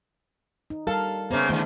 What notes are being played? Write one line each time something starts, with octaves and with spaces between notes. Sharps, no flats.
D#4
G3 A4 A#4 F5
C#3 A#3 B3 C5 E5
D#2 D3 A3